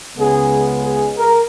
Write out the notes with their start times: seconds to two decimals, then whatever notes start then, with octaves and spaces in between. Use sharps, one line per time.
0.16 C#2 C#3 G#3 B3 G#4
0.84 G#4
1.17 A#4